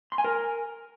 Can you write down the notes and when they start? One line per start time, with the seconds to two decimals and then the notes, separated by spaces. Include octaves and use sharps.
0.12 C6
0.18 G#5
0.24 A#4